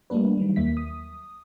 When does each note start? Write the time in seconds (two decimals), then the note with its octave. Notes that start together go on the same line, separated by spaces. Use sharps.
0.10 G3 A3 A#3 D4 B4
0.37 D#3 F#3 G3
0.56 D#2 A#3 E5 B6
0.77 D#6